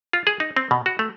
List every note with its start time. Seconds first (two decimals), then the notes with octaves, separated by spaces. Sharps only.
0.13 F4
0.27 G#4
0.40 D#4
0.57 C4
0.71 B2
0.86 F#4
0.99 A3